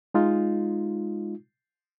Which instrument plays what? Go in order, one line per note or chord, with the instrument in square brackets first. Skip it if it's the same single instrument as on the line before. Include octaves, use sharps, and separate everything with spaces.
[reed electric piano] G#3 D#4 F4